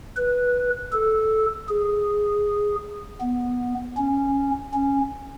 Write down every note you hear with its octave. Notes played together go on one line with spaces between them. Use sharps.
B4
A4
G#4
B3
C#4
C#4